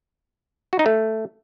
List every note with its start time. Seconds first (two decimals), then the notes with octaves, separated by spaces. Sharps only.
0.73 F#4
0.79 D#4
0.86 A3